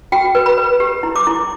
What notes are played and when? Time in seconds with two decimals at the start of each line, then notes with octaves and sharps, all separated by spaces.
0.12 F#4 G5
0.35 B4
0.46 B5
0.58 B4
0.80 G4
1.03 E4
1.16 D6
1.27 E4